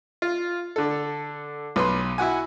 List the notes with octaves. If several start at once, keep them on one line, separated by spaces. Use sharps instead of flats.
F4
D3 A4
B1 B4 C6
E4 F#4 F#5 G#5